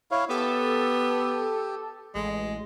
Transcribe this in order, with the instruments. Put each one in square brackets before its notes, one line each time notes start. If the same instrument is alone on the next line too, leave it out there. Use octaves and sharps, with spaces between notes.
[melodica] E4 C#5 F5
[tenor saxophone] B3 [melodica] G4 [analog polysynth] A4
[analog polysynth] A1 [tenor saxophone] G#3